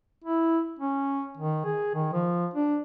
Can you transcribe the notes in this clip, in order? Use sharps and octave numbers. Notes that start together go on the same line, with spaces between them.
E4
C#4
D#3
G#4
D#3
F3
D4